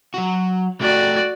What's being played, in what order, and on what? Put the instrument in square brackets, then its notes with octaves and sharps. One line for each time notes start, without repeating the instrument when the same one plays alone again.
[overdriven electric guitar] F#3 F#4
[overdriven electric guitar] A3 G4 [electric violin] F#4 D5